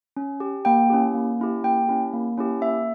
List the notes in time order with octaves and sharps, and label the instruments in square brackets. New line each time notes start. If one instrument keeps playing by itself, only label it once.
[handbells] C#4
G4
A#3 G5
C#4 E4 G4
A#3
C#4 E4 G4
A#3 G5
C#4 E4 G4
A#3
C#4 E4 G4
A#3 E5